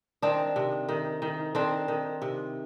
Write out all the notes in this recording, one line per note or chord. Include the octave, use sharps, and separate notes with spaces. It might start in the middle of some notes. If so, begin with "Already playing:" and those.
D#3 C4 D4
C3
D#3
D#3
D#3 C4 D4
D#3
C3